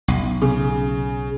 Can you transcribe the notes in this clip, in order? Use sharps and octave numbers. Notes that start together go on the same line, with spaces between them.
B1
C#3